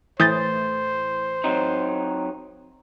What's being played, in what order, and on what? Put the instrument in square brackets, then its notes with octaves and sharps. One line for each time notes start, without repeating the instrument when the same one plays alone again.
[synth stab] A2 E3 [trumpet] C5 [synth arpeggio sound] D#6 G6 A6
[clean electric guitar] F#3 C4 D#4